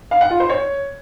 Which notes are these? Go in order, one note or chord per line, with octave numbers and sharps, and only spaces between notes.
F5
F#5
F4
C5
C#5